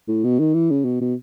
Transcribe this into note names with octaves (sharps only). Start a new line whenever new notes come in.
A2
B2
D#3
E3
C#3
B2
B2